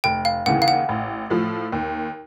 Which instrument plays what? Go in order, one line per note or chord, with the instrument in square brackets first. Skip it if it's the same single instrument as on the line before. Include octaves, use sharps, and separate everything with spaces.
[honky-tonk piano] F1 [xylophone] G5
[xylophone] F5
[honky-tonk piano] D#2 C#3 E3 [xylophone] F#5
[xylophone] F5
F#5
[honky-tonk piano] A1
A2 F3
D#2